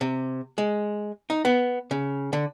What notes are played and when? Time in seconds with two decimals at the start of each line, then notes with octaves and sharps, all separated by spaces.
0.01 C3
0.58 G#3
1.30 D#4
1.45 B3
1.91 C#3
2.33 D3